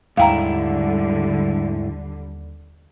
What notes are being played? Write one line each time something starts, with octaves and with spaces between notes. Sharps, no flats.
D#2 G#2 D3 G3 E4 F5 G5 A#5